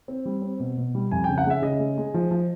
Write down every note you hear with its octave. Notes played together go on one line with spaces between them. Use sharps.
C4
G3
C4
B2
B2
G3
F2 G#5
C#3 G5
F#5
G#3 E5
C#3 D#5
G#3
G#3
F3
F3